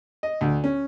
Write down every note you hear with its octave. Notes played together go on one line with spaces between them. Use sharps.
D#5
D2
C#4